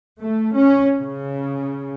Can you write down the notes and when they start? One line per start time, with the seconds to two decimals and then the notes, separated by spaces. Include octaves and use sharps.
0.20 A3
0.56 C#4
1.02 C#3